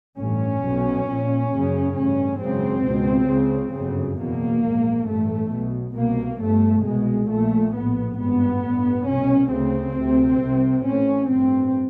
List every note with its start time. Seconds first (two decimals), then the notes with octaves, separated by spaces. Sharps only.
0.19 A1 G2 C#4
0.64 B1 B2
1.08 A#1 A#2
1.52 F#1 F#2 C#3
1.97 A1 G2 C#4
2.41 G#1 F#2 C#3 C4
2.86 C#2 B2
3.30 C#2 C#3
3.75 G1 F#2 C#3
4.19 F#1 E2 B2 A#3
4.64 A#1 G#2
5.08 A1 G2 A3
5.53 B1 B2
5.97 C2 B2 A#3
6.41 G1 G2 A3
6.86 C2 B2 G#3
7.31 A#1 A#2 A3
7.75 A#1 A2 B3
8.20 G#1 G2 B3
8.64 A1 G2
9.09 C2 B2 C#4
9.53 D2 C#3 C4
9.98 D2 C3
10.42 C2 C3
10.87 A1 A2 C#4
11.31 A1 G2 C4